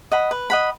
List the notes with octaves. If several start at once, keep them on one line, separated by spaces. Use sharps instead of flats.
D#5 F#5 B5
B4
D#5 F#5 B5